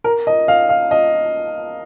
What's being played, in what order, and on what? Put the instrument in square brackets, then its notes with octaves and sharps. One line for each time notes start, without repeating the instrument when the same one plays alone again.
[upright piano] A#4
D#5
F5
F5
D#5